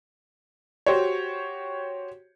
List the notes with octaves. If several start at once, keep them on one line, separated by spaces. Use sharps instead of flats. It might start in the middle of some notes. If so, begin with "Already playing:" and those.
F#4 G4 C5 C#5